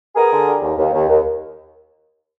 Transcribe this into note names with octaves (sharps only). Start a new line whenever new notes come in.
B3 G#4 A#4
D3
G3
D#2
D#2
D#2
D#2